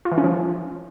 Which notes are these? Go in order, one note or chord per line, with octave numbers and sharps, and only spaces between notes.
F4
E3
C#4
F3